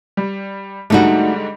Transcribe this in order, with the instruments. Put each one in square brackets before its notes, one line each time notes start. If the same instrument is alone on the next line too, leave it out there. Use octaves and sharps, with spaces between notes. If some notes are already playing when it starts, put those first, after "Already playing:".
[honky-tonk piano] G3
[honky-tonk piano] G#2 D3 G3 [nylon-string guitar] A3 D#4 F#4